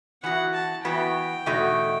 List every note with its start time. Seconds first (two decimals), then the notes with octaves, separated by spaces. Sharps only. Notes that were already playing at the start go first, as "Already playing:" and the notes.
0.23 E3 B3 F#4 F#5
0.53 A5
0.84 E3 B3 F#4 G5
1.46 E2 B2 A3 D#4 F#4